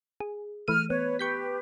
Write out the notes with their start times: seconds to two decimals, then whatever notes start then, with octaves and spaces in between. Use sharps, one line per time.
0.20 G#4
0.68 E3 A3 F6 D#7
0.90 B3 B4 C#5
1.19 G4 B4 C#6 G6 B6